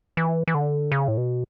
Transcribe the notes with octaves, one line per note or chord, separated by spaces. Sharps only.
E3
E3
D3
C#3
A2
B2